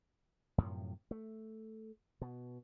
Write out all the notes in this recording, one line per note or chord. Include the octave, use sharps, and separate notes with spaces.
F#2 A2 C3 F3
A3
B2